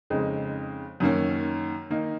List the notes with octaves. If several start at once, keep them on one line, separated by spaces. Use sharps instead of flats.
F2 C#3 G#3 C4 D#4
F#2 D#3 A#3 C#4
D#3 A#3 D#4